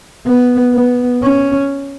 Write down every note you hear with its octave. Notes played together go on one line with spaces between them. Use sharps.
B3
B3
C#4